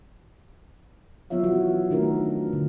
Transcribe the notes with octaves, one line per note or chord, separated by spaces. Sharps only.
F#3 B3 F4 C#5 E5 F5
E3 E4 F#4
D#3 A3 D4 D#4 F#4 A#4
D3